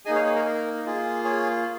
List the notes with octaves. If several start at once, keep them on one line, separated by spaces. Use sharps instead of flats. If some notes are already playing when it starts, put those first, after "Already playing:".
A#3 D#4 G#4 D#5 G#5
C#5 F5
G#4 C#5
A#4
A#4
A#3 F4 G#4
G#4 C#5